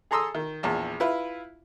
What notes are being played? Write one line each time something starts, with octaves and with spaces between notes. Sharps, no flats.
G#4 A4 A#5 C6 D#6 E6
D#3
A#1 E2 A5
E4 F4 B4